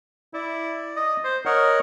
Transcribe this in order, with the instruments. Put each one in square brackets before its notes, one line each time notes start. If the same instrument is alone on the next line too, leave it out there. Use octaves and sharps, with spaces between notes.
[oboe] E4 [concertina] D5
[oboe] D#5
C5
[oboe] A#4 [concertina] C#5 D#5 F#5